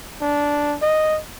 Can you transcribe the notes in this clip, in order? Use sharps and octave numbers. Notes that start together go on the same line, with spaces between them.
D4
D#5